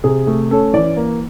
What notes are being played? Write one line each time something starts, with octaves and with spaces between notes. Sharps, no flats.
C3 G#4
A3
C#4 A4
E3 D5
A#3